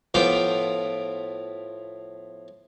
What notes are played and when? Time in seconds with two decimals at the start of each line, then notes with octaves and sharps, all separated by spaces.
0.14 A2 F3 B3 F5 G5 D6